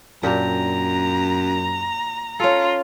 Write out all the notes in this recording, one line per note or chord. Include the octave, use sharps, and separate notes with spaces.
F#2 A#2 D4 G4 A#5
C#4 F4 A4